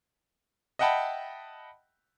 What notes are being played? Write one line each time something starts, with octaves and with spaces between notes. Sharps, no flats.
D#5 E5 F#5 G5 A5 B5